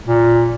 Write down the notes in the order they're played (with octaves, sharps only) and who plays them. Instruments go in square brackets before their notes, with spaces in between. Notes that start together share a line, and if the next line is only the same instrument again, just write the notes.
[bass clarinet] A#2